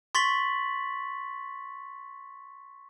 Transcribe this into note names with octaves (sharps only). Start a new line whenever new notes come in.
C6 C#6 A6 B6 F#7